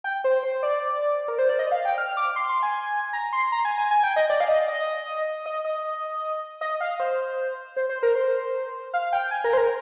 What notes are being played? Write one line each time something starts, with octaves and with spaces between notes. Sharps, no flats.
G5
C5
C5
D5
A#4
C5
D5
D#5
F5
G5
F6
D6
C6
C6
G#5
A#5
C6
A#5
G#5
G#5
G#5
G5
D#5
D5
F5
D#5
D#5
D#5
D#5
D#5
F5
C5
C5
C5
A#4
C5
F5
G5
G#5
A#4
C5
A#4